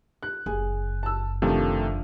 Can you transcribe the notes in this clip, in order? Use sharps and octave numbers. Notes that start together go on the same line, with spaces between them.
F#6
F#1 G#4 G#5
A5 E6
C3 D#3 F3 A3 D4